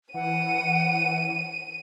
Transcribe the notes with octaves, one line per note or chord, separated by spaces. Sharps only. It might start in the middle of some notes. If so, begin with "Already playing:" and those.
E3 F#5 D#7